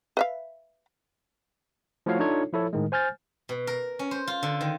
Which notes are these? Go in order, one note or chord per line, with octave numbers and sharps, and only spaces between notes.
B4 E5 F5
F3 A3 E4 F#4 C#5 F5
D4 D#4 F4 A4 C#5
F3 E4 A4 C#5
A2 D#3 G#3
C5 G#5 F6 G6 A6
B2
A#4
C#4
C5
F4
D3
D#3